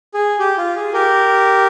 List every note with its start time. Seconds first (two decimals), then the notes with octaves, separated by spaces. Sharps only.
0.14 G#4
0.39 G4
0.58 F4
0.76 G#4
0.93 G4 A#4